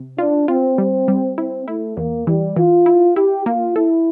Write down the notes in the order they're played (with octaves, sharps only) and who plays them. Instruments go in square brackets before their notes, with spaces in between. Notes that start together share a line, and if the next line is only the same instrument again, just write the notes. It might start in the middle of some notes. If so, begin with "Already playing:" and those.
Already playing: [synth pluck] C3
[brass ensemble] D4 [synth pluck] F4
[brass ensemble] C4 [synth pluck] F4
[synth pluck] G3 [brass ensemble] C4
[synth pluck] G3
[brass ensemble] C4 [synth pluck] E4
[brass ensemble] A3 [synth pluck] E4
[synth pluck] E2 [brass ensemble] A#3
[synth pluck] E3 [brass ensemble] G3
[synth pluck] E3 [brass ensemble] F4
[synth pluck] E4
[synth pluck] E4 [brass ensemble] G4
[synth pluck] A#3 [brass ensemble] F4
[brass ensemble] E4 [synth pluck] A4